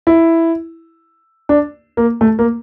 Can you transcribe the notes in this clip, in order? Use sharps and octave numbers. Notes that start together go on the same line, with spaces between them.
E4
D4
A#3
A3
A#3